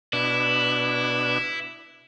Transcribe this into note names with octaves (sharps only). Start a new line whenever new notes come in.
B2 D4 E4